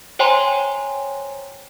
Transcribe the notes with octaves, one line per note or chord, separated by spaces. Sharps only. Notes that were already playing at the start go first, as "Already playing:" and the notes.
C5 C#5 G5 G#5 A#5 C6